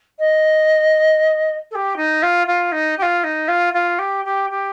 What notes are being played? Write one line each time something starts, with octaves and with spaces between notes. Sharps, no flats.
D#5
A4
G4
D#4
F4
F4
D#4
G4
F4
D#4
F4
F4
G4
G4
G4